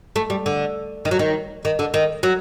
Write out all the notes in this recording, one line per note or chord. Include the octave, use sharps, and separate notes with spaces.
A3
G3
D3
D#3
F#3
D#3
D#3
D3
D#3
F#3